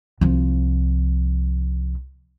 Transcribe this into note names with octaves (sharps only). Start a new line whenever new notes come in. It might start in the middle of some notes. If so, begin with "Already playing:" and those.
C2 F3